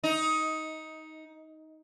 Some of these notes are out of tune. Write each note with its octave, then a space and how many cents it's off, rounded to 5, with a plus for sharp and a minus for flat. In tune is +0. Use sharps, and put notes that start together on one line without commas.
D#4 +15